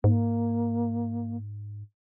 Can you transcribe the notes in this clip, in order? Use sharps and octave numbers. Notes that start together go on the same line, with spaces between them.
G#2 A#3